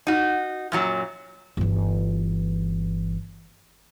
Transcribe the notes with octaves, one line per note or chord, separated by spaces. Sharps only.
D#4 F#4
F#2 A#2 F#3
G1 E3